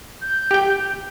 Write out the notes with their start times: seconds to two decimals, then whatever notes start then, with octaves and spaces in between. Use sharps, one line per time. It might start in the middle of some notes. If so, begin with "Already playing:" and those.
0.21 G6
0.51 G4 G5